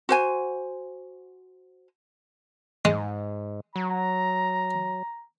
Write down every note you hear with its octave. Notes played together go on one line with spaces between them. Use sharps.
F#4 C5 G#5
G#2 G#3
F#3 A#5